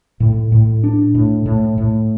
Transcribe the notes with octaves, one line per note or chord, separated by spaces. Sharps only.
A2
A2
D4
A2
A2
A2